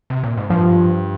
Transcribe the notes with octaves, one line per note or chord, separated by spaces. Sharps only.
C3
A#2
G#2
G2 F3